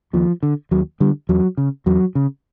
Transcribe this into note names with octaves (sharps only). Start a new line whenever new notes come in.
D#2 F3
D3
D#2 F#3
D3 G3
E2 F#3
C#3
E2 F#3
C#3